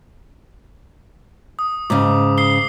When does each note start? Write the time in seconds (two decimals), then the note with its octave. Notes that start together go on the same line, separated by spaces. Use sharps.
1.59 D#6
1.90 G#2 C#3 D6
2.38 D#6 C7 G7